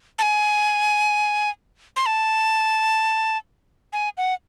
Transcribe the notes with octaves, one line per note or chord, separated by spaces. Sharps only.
A5
G#5
C6
A5
G#5
F#5